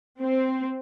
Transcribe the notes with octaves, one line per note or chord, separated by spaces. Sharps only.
C4